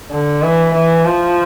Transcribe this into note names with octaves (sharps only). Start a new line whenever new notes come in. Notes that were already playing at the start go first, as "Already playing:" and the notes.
D3
E3
E3
F3